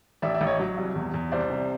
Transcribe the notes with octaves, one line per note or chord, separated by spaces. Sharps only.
A1 D5 E5
D5 E5
A1
C#5 D#5
F#3
C2
E2
E2
C2 C5 D5
C3